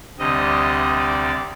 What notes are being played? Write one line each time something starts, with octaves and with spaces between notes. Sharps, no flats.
D2 C3 G3 D#5
D5